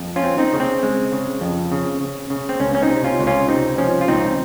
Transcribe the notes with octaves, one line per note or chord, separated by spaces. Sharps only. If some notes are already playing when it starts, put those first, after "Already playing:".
Already playing: F2
C#4 F4
C4
C4 D#4
C#3
C4
G#3
C#3
F2
C#3
C#3
C#3
C4
C#2 C#4
C#4
C4 D#4
C3
C#4 F4
C#2
C#4 F4
C3 C4 D#4
F3 C#4
F4
C#2 C4 D#4